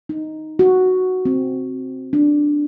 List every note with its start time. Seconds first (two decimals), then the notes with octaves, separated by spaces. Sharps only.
0.09 D#4
0.59 F#4
1.25 C4
2.13 D4